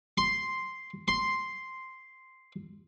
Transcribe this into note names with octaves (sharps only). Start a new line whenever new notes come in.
C6
C6